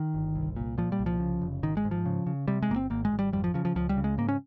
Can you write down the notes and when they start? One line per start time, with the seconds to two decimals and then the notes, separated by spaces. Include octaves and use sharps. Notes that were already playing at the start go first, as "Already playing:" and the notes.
Already playing: D#3
0.15 G1
0.35 C2
0.56 A#2
0.78 A#2 F3
0.92 G3
0.99 C2
1.06 F3
1.20 C#3
1.42 F1
1.63 G#1 D#3
1.77 G#3
1.85 G#2
1.91 F3
2.06 C#3
2.27 C#3
2.48 C3 G3
2.62 G#3
2.70 G1 A#3
2.76 C4
2.90 G#1 A#3
3.05 G#3
3.12 G#1
3.19 G3
3.33 F2 G3
3.44 F3
3.54 C#3 F3
3.65 F3
3.75 C#2 F3
3.89 G3
3.97 C#3
4.04 G#3
4.18 G#2 A#3
4.29 C#4